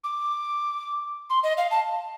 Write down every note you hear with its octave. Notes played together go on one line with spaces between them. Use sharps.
D6
C6
D#5
F5
A5